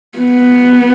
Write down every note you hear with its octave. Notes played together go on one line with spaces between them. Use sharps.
B3